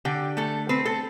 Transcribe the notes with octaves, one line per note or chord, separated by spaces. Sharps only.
D3 G4
A3 A4
C4 B4
A4